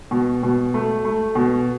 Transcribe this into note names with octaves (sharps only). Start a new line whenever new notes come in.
B2
B2
A3
A3
B2